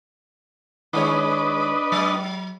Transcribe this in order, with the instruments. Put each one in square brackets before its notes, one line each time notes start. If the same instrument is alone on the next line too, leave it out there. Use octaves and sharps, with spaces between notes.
[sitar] D#3 G#3 C#5 [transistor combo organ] D4 B4 D#5
[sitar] F#3